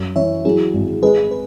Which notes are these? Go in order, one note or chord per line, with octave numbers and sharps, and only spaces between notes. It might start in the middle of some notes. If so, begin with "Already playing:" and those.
Already playing: F#2
E3 C#5 E5
F#3 E4 G#4
G#1
G#3 G#4 B4
B4